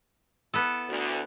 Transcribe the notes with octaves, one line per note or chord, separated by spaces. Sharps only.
B3 E4 A4
D2